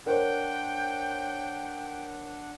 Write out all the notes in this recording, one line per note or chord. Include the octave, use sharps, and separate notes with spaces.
D4 A#4 C5 C#5 F#5 G5